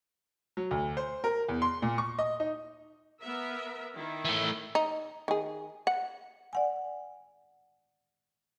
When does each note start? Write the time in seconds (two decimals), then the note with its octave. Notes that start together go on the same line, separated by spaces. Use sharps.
0.57 F#3
0.71 D2
0.97 C5
1.24 A#4
1.49 E2
1.62 C6
1.82 A#2
1.98 C#6
2.19 D#5
2.40 D#4
3.22 B3 A#4 E5
3.94 D#3 E4
4.25 E3 A3
4.75 D#4
5.28 D#3 G#4
5.87 F#5
6.53 D5 F#5 G#5